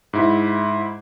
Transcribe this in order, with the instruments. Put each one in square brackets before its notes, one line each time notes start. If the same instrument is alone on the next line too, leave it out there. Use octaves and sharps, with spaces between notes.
[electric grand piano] G#2 E4